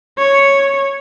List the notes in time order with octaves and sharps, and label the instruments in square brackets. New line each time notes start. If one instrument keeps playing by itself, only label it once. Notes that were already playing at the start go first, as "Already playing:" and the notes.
[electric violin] C#5